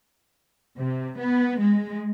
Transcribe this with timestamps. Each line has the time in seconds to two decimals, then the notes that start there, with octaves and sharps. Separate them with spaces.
0.79 C3
1.19 B3
1.60 G#3